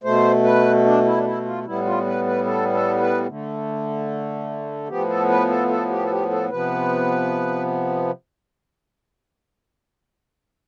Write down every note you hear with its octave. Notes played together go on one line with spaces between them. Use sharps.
B2 A3 C5
B4
D4
E4
D4
E4
F4
A2 G3 B3 E4
F4
B4
B4
A4
A4
B4
D3 A3
A2 F3 B3 G4
A4
B4
A4
A4
G4
A4
G4
A4
C3 F3 B3 B4